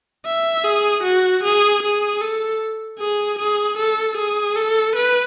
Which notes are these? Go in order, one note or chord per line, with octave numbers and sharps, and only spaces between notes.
E5
G#4
F#4
G#4
G#4
A4
G#4
G#4
A4
G#4
A4
B4